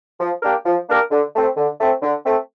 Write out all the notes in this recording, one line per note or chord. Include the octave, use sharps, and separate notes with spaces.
F3
A#3 D4 G4 A#4
F3
A#3 D4 G4 A#4
D3
A3 C4
D3
A3 C4
D3
A3 C4